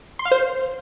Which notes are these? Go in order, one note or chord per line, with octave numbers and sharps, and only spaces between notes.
C6
F5
C5